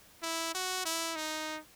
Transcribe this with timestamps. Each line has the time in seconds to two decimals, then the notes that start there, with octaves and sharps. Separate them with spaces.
0.23 E4
0.55 F#4
0.85 E4
1.16 D#4